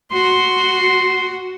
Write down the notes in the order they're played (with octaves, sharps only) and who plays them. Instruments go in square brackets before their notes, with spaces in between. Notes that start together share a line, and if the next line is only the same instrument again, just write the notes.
[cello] F#4 [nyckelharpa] C6